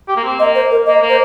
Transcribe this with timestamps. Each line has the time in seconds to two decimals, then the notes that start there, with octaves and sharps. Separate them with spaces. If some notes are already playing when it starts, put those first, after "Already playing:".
0.08 G4
0.16 A#3
0.24 C4
0.39 A#3 D#5
0.55 C5
0.71 A#4
0.86 A#3 D#5
1.02 A#3
1.09 C5